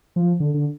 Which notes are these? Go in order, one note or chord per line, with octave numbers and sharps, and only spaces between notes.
F3
D3
D3